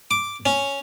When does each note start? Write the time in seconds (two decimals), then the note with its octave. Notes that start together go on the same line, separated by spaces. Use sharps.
0.11 D6
0.46 C#4